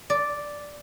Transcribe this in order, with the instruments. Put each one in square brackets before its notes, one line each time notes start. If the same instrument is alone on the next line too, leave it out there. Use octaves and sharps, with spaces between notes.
[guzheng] D5